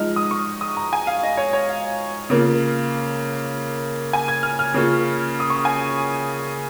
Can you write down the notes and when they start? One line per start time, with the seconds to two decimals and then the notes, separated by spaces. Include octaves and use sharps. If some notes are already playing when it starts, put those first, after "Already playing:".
Already playing: F3 G#3 D#4 F6
0.16 D#6
0.31 C#6
0.61 D#6
0.77 A#5
0.93 G#5
1.07 F5
1.23 D#5
1.37 C#5
1.53 C#5
1.69 F5
2.30 C#3 A#3 F4
4.13 G#5
4.28 G#6
4.43 F6
4.59 F6
4.74 C#3 A#3 C#4 F4
5.40 D#6
5.50 C#6
5.65 G#5